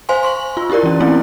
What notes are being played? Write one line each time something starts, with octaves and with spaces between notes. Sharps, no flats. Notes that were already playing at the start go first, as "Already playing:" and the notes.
C5 F5 G#5 C6
C6 C#6 F#7
F4
E4 F4 G4 A#4 D5
E3 C#4
A3 B3 C4 E4 D5